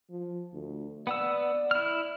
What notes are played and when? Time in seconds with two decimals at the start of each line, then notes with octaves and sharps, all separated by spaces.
0.10 F3
0.53 D2
1.07 B3 D5 F#5 E6
1.71 E4 F6